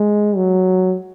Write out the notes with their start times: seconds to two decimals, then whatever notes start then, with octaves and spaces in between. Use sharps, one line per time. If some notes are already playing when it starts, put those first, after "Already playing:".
Already playing: G#3
0.36 F#3